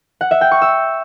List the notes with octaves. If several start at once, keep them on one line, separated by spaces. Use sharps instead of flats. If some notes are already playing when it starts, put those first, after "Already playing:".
F#5
E5
G5
C#6
E6